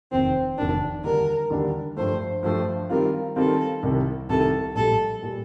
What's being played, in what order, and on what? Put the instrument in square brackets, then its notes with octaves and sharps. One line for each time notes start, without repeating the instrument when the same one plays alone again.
[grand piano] F1 D#2 D#3 [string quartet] C4
[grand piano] F1 D#2 D#3 [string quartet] D4
[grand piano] D#2 D3 G3 D4 [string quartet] A#4
[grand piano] D#2 D3 G3 D4
[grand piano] G2 F3 A3 [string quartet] C5
[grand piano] G2 F3 A3 [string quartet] C5
[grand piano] D#3 G3 C4 F4 [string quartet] A#4
[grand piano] D#3 G3 C4 F4 [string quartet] A4
[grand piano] C2 C3 D#3 G3
[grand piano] C2 C3 D#3 G3 [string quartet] A4
[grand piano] A#1 A#2 G3 [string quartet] A4
[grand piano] A#2 G3